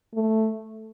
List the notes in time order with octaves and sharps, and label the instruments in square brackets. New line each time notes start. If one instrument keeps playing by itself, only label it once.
[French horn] A3